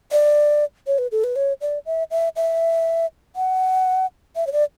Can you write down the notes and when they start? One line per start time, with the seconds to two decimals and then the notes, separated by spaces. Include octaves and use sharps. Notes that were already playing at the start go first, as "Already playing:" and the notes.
0.12 D5
0.87 C#5
0.98 B4
1.12 A4
1.24 B4
1.36 C#5
1.61 D5
1.86 E5
2.11 E5
2.36 E5
3.36 F#5
4.36 E5
4.47 C#5
4.52 D5